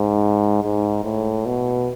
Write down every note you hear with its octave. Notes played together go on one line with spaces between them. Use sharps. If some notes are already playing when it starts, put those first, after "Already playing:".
Already playing: G#2
G#2
A2
B2